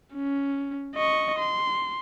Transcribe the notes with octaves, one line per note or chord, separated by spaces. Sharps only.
C#4
D#5 C#6
C6